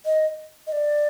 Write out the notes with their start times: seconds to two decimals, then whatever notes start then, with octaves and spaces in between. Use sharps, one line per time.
0.05 D#5
0.67 D#5
0.72 D5